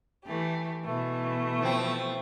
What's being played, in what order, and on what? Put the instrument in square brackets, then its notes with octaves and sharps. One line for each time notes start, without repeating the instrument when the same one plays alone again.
[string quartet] E3 A3 G4
B2 E3 A3
[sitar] F3 C4